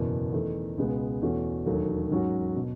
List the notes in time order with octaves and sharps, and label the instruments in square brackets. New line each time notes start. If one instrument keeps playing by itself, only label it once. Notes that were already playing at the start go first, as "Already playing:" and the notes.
Already playing: [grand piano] F#1 E2 B2
E2 D#3 A3 D#4
C#2 B2 G#3 B3
E2 B2 A3 C#4 F#4
E1 D#2 D#3 F#3 A3
G#2 F#3 C#4 F#4
B2